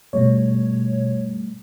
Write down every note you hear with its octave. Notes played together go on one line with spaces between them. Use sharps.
G2 B2 G3 A3 C#5